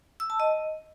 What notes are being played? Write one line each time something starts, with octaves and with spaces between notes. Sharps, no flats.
E6
A5
D#5